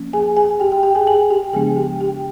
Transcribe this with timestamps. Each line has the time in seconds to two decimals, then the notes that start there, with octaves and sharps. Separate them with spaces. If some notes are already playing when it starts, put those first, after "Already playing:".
Already playing: F3 A#3 C#4
0.13 G#4 G#5
0.37 G#4 G#5
0.60 G4 G5
0.72 G4 G5
0.83 G4 G5
0.95 G#4 G#5
1.07 G#4 G#5
1.30 G4 G5
1.53 C#3 F3 G#3 B3 D4 G#4 G#5
1.76 G4 G5
2.01 G4 G5